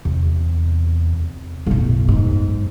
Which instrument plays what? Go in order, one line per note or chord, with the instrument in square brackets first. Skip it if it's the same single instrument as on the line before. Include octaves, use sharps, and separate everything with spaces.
[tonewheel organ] E2 [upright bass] C3
[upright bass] B1 A2 [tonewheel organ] F#2
[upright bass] G#2